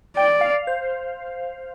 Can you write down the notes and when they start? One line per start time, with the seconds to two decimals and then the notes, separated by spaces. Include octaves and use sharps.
0.17 D5 G5
0.41 F5
0.67 C5